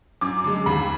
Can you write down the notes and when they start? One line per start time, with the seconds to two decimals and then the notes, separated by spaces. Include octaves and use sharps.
0.21 F#2 D6
0.44 D3 G#3
0.66 D#2 B5